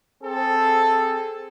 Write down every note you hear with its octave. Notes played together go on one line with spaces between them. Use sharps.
C4 G#4 A4